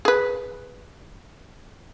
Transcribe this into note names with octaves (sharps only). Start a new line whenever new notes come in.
G#4 B4